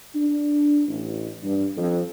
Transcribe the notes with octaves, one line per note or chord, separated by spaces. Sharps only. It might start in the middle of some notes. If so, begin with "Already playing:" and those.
D4
A1
G2
F2